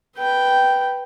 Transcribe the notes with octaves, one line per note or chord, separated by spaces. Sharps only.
B4 G5